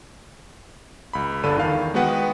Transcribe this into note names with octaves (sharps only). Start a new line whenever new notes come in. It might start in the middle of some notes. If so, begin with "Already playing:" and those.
C#2 B5
G1 D3 D4 A4 B5 D#7
E2 D#3 F5
G#3 B3 F#4 B4 F#5 G5